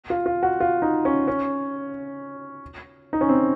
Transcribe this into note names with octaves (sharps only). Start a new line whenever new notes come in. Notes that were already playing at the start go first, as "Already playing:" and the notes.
F4
F4
F#4
F4
D#4
C#4
C#4
D#4
C#4
C4